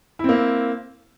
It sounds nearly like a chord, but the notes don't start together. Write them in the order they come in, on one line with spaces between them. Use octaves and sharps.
E4 C4 A#3